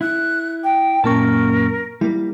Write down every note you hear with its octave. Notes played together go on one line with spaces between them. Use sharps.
E4 F#6
G5
F#2 A#2 A#3 C#4 A#4 A5 C#6
G3 A#3 E4